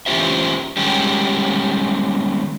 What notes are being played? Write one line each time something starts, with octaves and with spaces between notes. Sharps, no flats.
E3 C#4 F4 G4 C5 E5
D#3 G3 G#3 C#4 G4